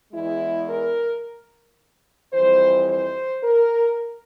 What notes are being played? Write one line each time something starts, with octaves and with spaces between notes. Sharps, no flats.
E2 E3 G#3 E4
A#4
F2 E3 G3 C5
C5
A#4